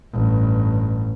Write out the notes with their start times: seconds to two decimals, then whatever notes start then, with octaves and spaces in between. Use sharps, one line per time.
0.13 A1 G2